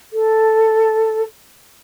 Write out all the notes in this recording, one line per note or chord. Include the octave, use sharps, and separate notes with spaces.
A4